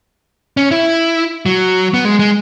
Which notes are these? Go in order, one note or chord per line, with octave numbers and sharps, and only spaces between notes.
C#4
E4
F#3
B3
G#3
G#3